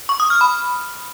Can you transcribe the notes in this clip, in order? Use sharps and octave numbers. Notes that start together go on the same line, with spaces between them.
C#6
D#6
F6
B5